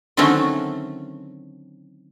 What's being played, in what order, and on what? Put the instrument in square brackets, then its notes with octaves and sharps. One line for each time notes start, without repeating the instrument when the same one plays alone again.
[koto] D3 D#3 F#3 A3 C4 C#4